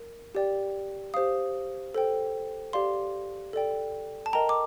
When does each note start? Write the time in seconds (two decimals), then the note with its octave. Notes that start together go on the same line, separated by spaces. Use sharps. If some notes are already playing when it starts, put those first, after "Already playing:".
Already playing: A#4
0.35 G4 D5 G5
1.14 G4 C5 F5 D#6
1.94 A4 C5 G5
2.73 G4 D5 F5 C6
3.53 A4 D5 G5
4.26 A5
4.33 A#4 D#5 G5 A#5
4.49 D6